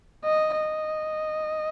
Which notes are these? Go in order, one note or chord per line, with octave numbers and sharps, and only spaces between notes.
D#5
D#5